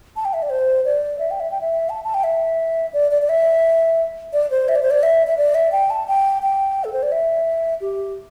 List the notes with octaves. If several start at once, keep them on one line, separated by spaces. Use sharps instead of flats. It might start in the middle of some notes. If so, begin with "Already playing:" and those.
A5
G5
E5
D5
C5
D5
E5
G5
E5
G5
E5
A5
A5
G5
E5
D5
D5
D5
E5
D5
C5
E5
D5
C5
D5
E5
E5
D5
E5
G5
A5
G5
G5
A4
C5
D5
E5
G4